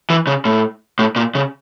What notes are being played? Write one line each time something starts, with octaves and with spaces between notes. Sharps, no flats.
E3
C#3
A2
A2
A#2
C#3